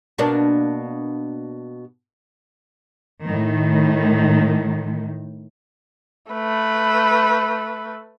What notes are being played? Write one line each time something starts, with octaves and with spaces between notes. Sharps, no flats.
B2 A#3 D4
A2 D#3
A3 B4